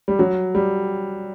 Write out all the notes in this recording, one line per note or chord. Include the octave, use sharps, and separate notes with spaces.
G3
F#3
G3